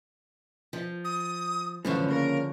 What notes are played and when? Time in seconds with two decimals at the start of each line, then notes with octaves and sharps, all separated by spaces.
0.73 F3
1.04 D#6
1.85 F#2 A2 D3 E3 F3 C#4 C5
2.08 C#3 A#3 A#4